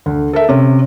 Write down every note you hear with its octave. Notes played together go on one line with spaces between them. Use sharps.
D2
A4 A#4 E5
C3 C#4